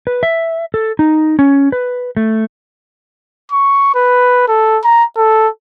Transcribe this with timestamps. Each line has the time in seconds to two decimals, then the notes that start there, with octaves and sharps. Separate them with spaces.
0.07 B4
0.23 E5
0.74 A4
0.99 D#4
1.39 C#4
1.72 B4
2.17 A3
3.52 C#6
3.95 B4
4.48 A4
4.84 A#5
5.17 A4